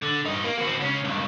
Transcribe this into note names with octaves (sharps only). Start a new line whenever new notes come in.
D3
G2 D#4
A#3
C4 F#4
C#2 C#4
C#2 G2